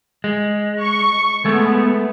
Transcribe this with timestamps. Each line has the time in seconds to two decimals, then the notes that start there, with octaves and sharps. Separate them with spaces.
0.24 G#3
0.82 C#6
1.45 G#3 A3 B3